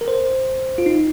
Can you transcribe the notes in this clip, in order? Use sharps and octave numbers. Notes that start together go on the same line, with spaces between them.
A#4
C5
F4
D#4